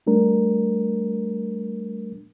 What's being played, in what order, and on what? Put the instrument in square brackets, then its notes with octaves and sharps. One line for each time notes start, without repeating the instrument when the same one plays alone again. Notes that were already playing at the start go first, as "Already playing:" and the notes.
[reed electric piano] G3 A3 D4 A#4